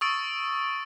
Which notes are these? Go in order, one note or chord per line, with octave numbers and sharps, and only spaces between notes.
C#6 D#6 E6 A6 D7